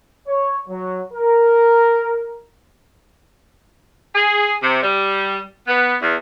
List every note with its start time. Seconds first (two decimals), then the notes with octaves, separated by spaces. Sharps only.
0.28 C#5
0.69 F#3
1.14 A#4
4.15 G#4
4.61 C3
4.83 G3
5.67 B3
6.02 E2